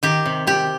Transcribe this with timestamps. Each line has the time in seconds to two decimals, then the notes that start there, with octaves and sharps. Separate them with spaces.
0.03 D#3 G4
0.26 C3
0.47 C3 G4